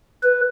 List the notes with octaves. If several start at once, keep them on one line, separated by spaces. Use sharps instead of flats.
B4